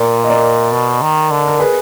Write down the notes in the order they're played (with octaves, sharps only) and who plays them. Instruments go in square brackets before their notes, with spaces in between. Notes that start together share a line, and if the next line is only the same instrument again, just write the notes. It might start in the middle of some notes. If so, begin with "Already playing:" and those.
Already playing: [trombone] A#2 [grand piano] A#4 D5
[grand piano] D#5
A#4 D5
[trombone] B2
D#3
D3
[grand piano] A#4
G#4 B4